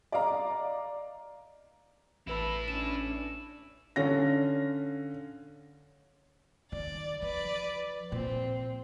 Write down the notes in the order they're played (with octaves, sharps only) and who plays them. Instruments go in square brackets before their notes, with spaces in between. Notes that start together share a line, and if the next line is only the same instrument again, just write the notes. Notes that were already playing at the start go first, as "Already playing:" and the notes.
[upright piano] D5 D#5 F5 A#5
[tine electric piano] A1 B4 B5 [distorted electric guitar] E4 A4
[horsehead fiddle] C#4 D4 [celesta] E7
[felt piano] D3 C#4 F5 A#6
[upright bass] D#3 [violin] D5
[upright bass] F3 [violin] B4 D5
[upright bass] A#2 [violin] C4